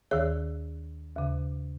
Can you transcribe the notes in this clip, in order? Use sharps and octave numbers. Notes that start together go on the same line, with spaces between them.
D#2 D#3 G#4 C#5
D#2 C#3